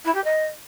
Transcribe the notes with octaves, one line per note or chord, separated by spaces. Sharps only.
E4
G4
D#5